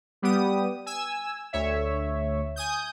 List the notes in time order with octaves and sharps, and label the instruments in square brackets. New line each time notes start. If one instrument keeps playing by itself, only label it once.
[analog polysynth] G3 B3 G4 D#6
G#5 E6
D2 C#5 E5
G#5 D#6 G6